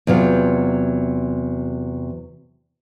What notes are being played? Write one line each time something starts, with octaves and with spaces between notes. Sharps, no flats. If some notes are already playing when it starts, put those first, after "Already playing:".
E2 C3 F#3 F4